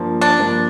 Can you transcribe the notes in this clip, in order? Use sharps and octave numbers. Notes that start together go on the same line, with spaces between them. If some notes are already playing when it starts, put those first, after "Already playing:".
Already playing: G2 F3 A#3
D4
G2 F3 A#3